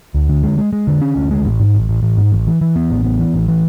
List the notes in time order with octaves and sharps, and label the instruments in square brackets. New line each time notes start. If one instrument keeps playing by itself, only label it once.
[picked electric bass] D2
D3
G#3
G#3
G#3
D3
C#4
D2
G#3
A1
G#2
A1
A1
A1
G#2
A1
E3
E3
B3
A1
B3
E3
A1
E3